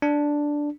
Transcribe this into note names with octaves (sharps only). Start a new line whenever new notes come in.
D4